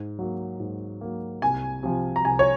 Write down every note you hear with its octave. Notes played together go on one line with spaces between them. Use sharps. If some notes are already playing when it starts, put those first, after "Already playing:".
Already playing: G#2
F#3 A#3
G#2
F#3 A#3
C2 G#5
C3 F3
A#5
C2 G#5
C#5